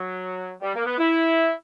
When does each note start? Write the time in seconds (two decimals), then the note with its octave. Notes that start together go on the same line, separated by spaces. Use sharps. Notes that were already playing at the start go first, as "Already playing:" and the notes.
Already playing: F#3
0.62 G3
0.75 A#3
0.86 B3
0.98 E4